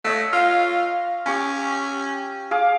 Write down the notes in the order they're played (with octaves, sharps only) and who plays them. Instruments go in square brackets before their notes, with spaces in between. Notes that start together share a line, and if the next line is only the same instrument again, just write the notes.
[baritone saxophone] A3 [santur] C#5 D#5 F#5
[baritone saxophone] F4 [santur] F5
[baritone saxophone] C#4 [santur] G4 C#6 D6
[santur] G#4 F5 D6